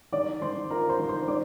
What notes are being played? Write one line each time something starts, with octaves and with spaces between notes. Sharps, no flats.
D#3 D5 D6
D#3 C5 C6
F4 A#4 A#5
C5 C6
D#3
C5 C6
D#3 D5 D6